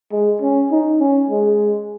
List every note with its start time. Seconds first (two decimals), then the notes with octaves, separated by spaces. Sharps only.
0.12 G#3
0.42 C#4
0.71 D#4
1.00 C#4
1.30 G#3